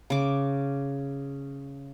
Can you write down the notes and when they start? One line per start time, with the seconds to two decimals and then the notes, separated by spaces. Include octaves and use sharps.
0.10 C#3 D6